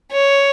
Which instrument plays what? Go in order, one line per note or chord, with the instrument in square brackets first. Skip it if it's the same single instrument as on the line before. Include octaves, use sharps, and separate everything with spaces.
[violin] C#5